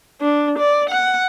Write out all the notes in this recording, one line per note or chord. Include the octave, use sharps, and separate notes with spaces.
D4
D5
F#5